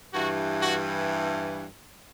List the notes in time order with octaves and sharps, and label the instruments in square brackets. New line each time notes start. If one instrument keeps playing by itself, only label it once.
[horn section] G2 E3 F#4
F#4